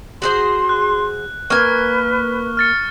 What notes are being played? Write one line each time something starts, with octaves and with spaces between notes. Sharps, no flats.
F#4 G#4 C5 C6
F#6
A#3 B4 G#5 C#6 F6
F6 A6 C#7